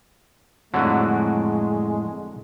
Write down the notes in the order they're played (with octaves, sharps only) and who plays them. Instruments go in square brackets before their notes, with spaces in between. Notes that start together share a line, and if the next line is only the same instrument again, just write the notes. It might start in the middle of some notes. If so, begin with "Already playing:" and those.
[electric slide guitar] F2 A2 [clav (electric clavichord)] D3 F#3 [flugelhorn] G#3